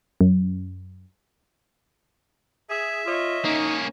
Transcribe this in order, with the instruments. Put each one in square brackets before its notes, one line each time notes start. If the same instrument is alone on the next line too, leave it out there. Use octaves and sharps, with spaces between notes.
[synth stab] F#2
[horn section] G#4 [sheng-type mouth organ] E5
[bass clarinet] F4 [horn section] C#5 D#5
[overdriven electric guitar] A#3 C#4 [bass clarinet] D#4